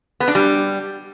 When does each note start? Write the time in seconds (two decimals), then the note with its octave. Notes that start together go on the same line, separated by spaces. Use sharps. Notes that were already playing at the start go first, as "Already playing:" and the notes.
0.20 B3
0.28 D4
0.35 G3